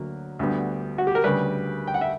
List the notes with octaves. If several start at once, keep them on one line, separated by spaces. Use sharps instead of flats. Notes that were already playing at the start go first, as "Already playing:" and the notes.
Already playing: D2 F#3 A#3
D2 D3 G3 B3
F#4
G4
A#4
D2 C#3 G3 B4
G5
F#5
E5